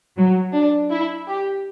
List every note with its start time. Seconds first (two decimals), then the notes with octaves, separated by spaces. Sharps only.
0.17 F#3
0.54 D4
0.91 E4
1.28 G4